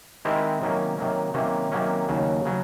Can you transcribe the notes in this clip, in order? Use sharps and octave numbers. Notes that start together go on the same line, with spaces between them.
D#3 G#3 C4 E4 G4
C3 D#3 F#3 A#3 C#4
C3 D#3 F#3 A#3 C#4
C3 D#3 F#3 A#3 C#4
C3 D#3 F#3 A#3 C#4
D#2 C#3 F#3
C#3 F#3